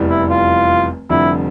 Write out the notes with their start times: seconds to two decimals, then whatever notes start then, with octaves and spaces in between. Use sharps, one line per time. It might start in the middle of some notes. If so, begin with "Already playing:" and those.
Already playing: F1 E2 E3 G3
0.09 E4
0.30 F4
1.09 F1 F2 D3 G3 E4